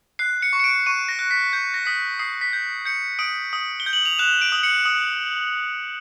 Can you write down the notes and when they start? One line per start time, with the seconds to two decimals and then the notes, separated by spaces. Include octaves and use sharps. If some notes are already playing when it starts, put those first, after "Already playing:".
0.19 F#6 C7
0.42 C#7
0.53 C#6
0.59 C#7
0.64 D7
0.86 C#6 D#7
1.09 A#6
1.19 F#6
1.31 B6
1.53 G6
1.74 A#6
1.86 D#6 B6
2.19 D#6 C7
2.41 B6
2.53 G6
2.85 G6 C#7
3.19 D#6 D7
3.53 D#6
3.80 G7
3.86 G6
3.93 F#7
4.05 F7
4.19 F#6 E7
4.41 D7
4.52 D#6
4.63 C#7
4.85 D#6